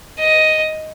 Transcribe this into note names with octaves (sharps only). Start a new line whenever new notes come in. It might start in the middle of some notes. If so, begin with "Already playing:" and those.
D#5